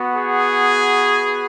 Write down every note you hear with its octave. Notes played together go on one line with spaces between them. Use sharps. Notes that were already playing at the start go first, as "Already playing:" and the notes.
Already playing: B3 F#4
G#4